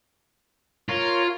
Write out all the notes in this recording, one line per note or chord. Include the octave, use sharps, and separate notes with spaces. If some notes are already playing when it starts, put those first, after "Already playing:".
F4 A#4 C#5